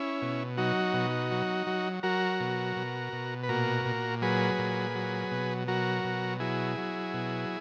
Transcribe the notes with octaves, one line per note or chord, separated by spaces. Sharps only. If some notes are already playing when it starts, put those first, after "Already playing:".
Already playing: C#4 E4
B2
F#3 D#4 F#4
B2
F#3
F#3
F#3 F#4 A#4
B2
B2
B2
B4
A#2 F#4 A#4
A#2
F#3 G#4 B4
A#2
F#3
B2
F#3 F#4 A#4
B2
F#3 E4 G#4
F#3
B2